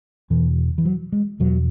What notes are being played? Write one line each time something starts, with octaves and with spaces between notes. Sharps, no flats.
E2 B2 E3
E3
F#3
G#3
E2 B2 F#3